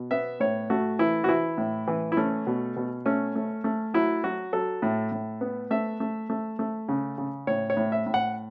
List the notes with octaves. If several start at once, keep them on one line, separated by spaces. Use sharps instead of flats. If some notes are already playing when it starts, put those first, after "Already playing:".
Already playing: B2
B3 E5
A2 C#5
A3 F#4
E3 E4
F#4
E3 E4
A2
E3
E4
A3 C#4
B2
B2
A3 C#4
A3
A3
F#3 E4
F#3 F#4
F#3 A4
A2
A2
B3
A3 E5
A3
A3
A3
C#3
C#3
A2 C#5
C#5
A2
E5
A2
F#5